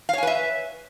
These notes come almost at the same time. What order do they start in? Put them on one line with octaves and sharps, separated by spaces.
F5 C#5 G#5 B4 E5